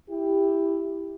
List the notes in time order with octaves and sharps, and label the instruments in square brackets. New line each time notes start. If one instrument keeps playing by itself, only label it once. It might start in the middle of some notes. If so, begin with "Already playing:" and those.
[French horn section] E4 G4